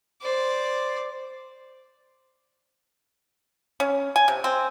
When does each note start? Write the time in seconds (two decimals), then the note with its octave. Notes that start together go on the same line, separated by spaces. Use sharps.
0.21 C5 D5
3.80 C#4
4.16 G#5
4.28 C3
4.44 C4